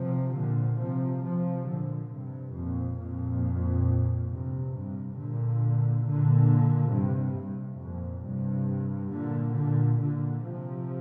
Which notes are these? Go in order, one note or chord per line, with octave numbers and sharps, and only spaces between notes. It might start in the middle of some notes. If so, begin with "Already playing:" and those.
Already playing: C3 F3
A#2 D3
C3 F3
C3 F3
A#2 D3
G2 C3
F2 A#2
F2 A#2
G2 C3
G2 C3
A#2 D3
A#2 D3
G2 C3
G2
F2 A#2
G2 C3
A#2 D3
A#2 D3
A#2 D3
C3 F3